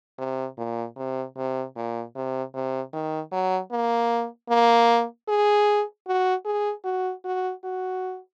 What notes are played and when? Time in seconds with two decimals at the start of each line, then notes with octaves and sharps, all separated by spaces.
0.18 C3
0.58 A#2
0.97 C3
1.37 C3
1.76 A#2
2.15 C3
2.54 C3
2.93 D#3
3.32 F#3
3.72 A#3
4.49 A#3
5.28 G#4
6.07 F#4
6.45 G#4
6.85 F#4
7.25 F#4
7.64 F#4